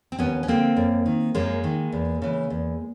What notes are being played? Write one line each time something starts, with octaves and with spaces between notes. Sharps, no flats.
C4
D#2 B3 C#4
C#4
D3 A#3 C4
F#2
D#3
F#2 G#3 A#3
D#3
E2
C#3 E3
E2